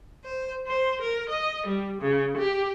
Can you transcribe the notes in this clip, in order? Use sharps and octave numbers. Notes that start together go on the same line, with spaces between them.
C5
C5
A#4
D#5
G3
C#3
G4